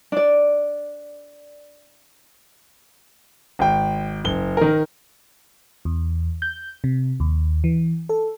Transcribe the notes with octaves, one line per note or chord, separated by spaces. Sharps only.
D4 D5
G#1 G5
F#1 G7
D#3 A#4
E2
G6
C3
D#2
E3
A4